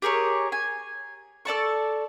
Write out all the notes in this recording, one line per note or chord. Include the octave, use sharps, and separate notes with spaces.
G4 G#4 A#4 C#5
G#5
A4 D5 A5 C#6